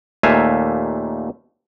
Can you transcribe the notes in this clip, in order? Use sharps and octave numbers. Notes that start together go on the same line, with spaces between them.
D#2 A#2 A3 E5 F5 G#5